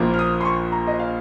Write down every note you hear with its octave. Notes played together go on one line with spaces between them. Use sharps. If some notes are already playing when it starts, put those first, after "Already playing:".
Already playing: A#1 A#2 F3 A#3
F6
D#6
C6
C#6
A#5
D#5
F5